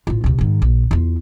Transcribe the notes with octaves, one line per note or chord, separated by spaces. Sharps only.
A1 F4
D2 C3
G#2 D#3
A#1
E2 F4